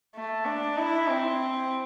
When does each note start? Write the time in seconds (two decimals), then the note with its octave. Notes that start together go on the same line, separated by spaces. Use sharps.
0.15 A3
0.45 D4
0.77 E4
1.08 C4